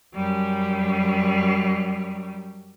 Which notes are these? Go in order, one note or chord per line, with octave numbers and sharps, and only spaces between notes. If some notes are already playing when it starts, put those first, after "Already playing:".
F#2 G3